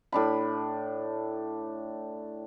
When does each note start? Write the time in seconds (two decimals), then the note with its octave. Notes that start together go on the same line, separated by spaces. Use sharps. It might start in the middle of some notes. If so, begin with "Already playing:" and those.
0.12 A2 D4 B5